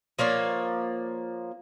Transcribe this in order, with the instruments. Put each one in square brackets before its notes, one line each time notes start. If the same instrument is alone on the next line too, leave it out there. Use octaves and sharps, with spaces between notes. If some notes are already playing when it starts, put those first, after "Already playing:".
[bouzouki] F3 A#3 C#5 D5